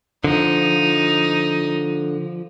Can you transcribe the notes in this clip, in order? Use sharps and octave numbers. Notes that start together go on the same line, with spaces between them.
D3 F3 D#4